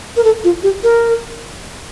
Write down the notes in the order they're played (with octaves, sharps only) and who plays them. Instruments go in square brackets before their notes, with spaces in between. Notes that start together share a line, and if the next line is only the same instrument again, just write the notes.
[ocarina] A#4
A4
F4
G4
A#4